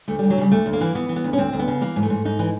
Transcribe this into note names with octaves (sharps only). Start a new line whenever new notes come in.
D2 A3
D2 G3
F#3
C#3 G3
D2 A3
D2
A#3
E3
E3 B3
E3
B3
D2
C#4
D2 C4
D2
B3
C#3
E3 A#3
G#2
A3
G#2
G#2 D#4
E3